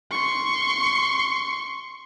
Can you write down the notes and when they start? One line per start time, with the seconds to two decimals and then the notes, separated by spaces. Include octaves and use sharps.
0.12 C6 C#6